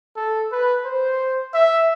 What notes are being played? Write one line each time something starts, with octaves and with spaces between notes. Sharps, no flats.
A4
B4
C5
E5